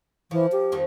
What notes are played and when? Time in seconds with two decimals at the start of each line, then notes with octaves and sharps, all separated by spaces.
0.31 E3 F3
0.52 G4
0.72 F2 D#3 F3